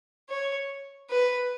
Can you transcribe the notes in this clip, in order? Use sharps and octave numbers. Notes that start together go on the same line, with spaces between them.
C#5
B4